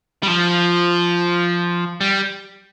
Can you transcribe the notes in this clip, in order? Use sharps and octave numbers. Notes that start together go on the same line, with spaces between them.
G3
F3
G3